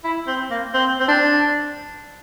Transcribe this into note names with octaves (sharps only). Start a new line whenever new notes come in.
E4
C4
A#3
C4
C4
D4